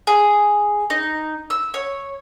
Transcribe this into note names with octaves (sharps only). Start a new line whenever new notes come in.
G#4
D#4
E6
C#5